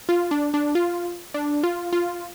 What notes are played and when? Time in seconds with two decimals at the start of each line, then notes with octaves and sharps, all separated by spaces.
0.09 F4
0.31 D4
0.54 D4
0.75 F4
1.34 D4
1.63 F4
1.93 F4